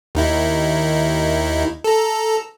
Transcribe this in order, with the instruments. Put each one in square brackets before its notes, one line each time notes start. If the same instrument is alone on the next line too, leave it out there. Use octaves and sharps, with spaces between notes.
[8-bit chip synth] D#2 D#4 E4
A4 A#5